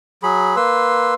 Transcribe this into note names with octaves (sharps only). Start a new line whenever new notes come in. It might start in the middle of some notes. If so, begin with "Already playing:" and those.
F#3 G#4 B5
A#3 B4 C6 E6